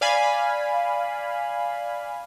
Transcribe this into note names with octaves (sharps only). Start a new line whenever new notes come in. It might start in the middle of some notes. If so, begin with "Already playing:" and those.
D5 F5 G#5 B5